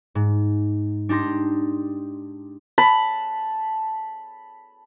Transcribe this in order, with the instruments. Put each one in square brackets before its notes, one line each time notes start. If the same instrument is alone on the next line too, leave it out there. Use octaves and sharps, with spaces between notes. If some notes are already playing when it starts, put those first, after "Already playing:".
[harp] G#2
D4 D#4 G4 C6 A#6
[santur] A5 B5